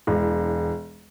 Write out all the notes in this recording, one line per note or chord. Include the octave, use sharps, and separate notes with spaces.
E1